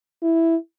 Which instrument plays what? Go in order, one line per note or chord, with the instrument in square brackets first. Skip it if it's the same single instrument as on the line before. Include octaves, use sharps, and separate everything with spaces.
[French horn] E4